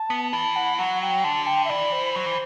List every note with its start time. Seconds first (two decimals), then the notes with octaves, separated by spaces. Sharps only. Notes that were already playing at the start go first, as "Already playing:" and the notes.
Already playing: A5
0.10 B3
0.32 E3 A5
0.56 F#5
0.78 F#3 F#5
1.02 G5
1.24 D3 A5
1.47 G5
1.65 E5
1.70 E3 D5
1.92 C5
2.16 F#3
2.26 E3